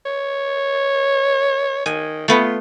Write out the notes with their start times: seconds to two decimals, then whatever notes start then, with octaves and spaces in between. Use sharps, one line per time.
0.05 C#5
1.86 D#3 G#5
2.28 A3 B3 F4 B4